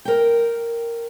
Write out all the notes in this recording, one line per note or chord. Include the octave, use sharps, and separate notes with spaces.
A#4 G5